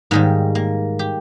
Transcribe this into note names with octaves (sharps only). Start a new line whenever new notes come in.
G#2 D#3 G3 A#3
A#3
G4